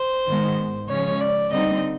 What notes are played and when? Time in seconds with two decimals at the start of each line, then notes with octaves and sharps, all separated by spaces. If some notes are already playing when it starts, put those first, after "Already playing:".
Already playing: C5
0.27 G#2 D#3 G#3 B3
0.89 C#3 F3 G#3 C#4 C#5
1.20 D5
1.52 D3 G3 C4 D#4 D#5